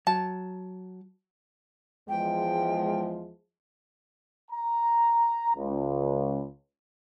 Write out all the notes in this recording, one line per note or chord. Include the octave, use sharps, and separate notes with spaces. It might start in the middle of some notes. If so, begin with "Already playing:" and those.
F#3 A5
E2 F3 G#3 G5
A#5
C#2